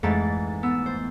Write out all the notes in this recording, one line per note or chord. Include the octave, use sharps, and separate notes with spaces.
F2 G#2 E3 A3 A6
B3 E6
C5